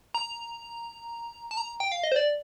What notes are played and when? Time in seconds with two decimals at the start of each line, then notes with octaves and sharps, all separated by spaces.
0.15 A#5
1.51 A5
1.57 A#5
1.80 G5
1.92 F5
2.04 D#5
2.12 C5
2.16 D5